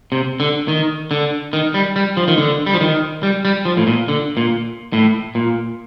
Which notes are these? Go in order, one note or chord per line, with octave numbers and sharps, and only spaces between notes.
C3
D3
D#3
D3
D#3
G3
G3
F3
D#3
D3
G3
F3
D#3
G3
G3
F3
A2
A#2
D3
A#2
A2
A#2